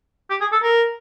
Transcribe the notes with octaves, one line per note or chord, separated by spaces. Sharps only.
G4
G#4
A4
A#4